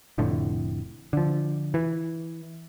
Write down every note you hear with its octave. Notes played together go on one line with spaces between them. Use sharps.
F1 F2 A2 D3
D3 F3
E3